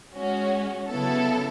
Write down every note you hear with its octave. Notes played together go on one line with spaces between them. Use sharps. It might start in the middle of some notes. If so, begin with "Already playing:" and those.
G#3 C#4 F#4
C#3 F#3 B3 E4 A4